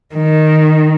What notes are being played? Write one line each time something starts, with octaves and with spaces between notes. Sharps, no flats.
D#3